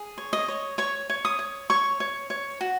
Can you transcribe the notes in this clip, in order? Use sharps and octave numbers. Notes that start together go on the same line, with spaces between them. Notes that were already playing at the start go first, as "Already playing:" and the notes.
Already playing: G#4
C#5
D#5
C#5
C#5 C#6
C#5
D#6
C#5
C#5 C#6
C#5
C#5
F#4